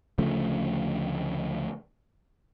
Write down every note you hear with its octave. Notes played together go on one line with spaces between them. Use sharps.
D2 C#3 F3 A3